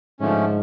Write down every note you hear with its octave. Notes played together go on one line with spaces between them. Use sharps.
G#2 D3 F3 A3 C#4